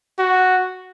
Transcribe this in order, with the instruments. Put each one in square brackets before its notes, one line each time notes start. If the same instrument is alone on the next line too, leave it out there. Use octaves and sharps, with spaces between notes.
[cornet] F#4